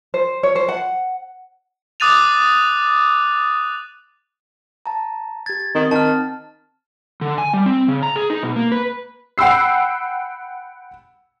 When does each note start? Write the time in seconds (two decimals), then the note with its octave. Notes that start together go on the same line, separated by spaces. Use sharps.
0.14 C5
0.43 C#5
0.55 C5
0.68 F#5
2.00 D6 D#6 F#6 A6 D#7 F7
4.86 A5 A#5
5.46 G4 G#6 A6
5.75 D#3 C4
5.91 D#3 A5 F6
7.21 D3
7.38 G#5
7.53 G3
7.66 C4
7.88 C#3
8.03 A#5
8.16 G#4
8.30 D#4
8.43 B2
8.56 A#3
8.72 B4
9.38 F#5 G5 B5 E6 C7